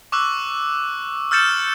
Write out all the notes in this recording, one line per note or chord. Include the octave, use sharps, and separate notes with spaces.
C#6 D6 E6 F#6
E6 F6 G6 A6 C#7 E7